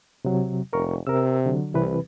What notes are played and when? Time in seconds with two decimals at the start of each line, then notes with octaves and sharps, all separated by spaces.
0.25 C3 F#3
0.73 F1 A#4 C#6
1.07 C3 A#4 E6
1.46 D3 F#3
1.74 C2 C3 E3 B4